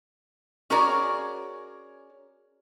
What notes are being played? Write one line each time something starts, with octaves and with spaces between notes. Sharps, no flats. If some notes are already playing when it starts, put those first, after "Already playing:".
C#4 F#4 G#4 A#4 C#5 D5